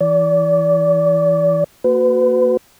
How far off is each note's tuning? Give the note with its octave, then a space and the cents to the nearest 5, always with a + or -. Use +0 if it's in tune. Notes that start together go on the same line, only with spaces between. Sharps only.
E3 +0 D5 -30
A#3 -20 F#4 +0 B4 +35